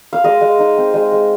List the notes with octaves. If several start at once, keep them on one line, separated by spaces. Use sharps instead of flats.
F5
G#3 D#5
G#3
D#4
C4
G#3
G#3